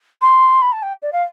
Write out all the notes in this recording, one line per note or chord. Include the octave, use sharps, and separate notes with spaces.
C6
B5
A5
G5
D5
F5